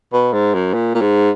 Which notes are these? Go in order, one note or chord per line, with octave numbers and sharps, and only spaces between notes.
B2
G#2
F#2
A#2
A#2
G#2